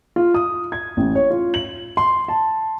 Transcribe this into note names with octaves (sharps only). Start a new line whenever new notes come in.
F4
D#6
G#6
A1
C#5
F4
F#7
C6
A5